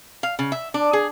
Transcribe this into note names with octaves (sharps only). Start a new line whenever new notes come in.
F5
C#3
E5
D4
G#4